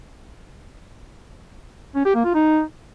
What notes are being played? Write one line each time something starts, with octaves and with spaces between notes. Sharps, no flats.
C#4
G4
A#3
F4
D#4